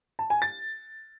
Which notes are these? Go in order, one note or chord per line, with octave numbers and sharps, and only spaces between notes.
A5
G#5
A6